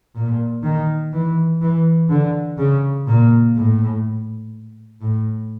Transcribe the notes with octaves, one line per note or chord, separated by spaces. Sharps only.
A#2
D#3
E3
E3
D3
C#3
A#2
A2
A2